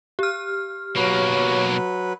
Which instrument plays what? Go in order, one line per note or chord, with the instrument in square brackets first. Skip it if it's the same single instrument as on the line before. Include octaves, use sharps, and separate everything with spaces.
[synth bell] G4 F6
[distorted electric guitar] B1 A#3 [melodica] F#3 B4 [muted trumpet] C#5